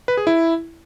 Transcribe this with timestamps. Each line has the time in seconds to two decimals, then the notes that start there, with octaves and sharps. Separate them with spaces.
0.08 B4
0.17 G#4
0.27 E4